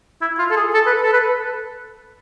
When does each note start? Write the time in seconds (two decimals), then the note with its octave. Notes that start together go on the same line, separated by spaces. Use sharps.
0.21 E4
0.39 F4
0.51 A4
0.57 G#4
0.74 A4
0.86 B4
1.02 A4
1.13 B4